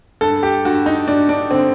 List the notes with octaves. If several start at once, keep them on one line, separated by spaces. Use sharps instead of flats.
G2 A4
G4
G2 F#4
D#4
G2 D4
D4
D3 C4